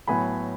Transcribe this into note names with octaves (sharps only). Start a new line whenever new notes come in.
A2 F#3 B3 G#5 B5